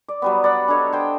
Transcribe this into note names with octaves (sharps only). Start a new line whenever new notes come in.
D5
F#3 G3 B3
D5 F#5 B5
D4 A4 C#5 D#5
C5 G5